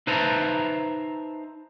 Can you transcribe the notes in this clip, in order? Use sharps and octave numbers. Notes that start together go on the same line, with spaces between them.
D#4 B4 C5 E5 A5 A#5